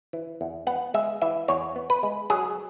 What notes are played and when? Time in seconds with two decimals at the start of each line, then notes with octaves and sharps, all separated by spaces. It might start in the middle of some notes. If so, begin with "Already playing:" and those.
0.13 E3
0.41 E2
0.67 B3 F#5
0.94 G#3 E5
1.22 E3 E5
1.48 E2 C#5
1.76 B3
1.90 B4
2.03 G#3
2.30 F#3 G#4